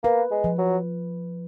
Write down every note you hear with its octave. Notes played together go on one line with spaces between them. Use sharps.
A#3 B4
G#3
F3
F#3